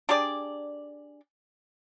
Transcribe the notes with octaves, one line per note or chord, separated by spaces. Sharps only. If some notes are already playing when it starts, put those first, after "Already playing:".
D4 G4 G#4 D5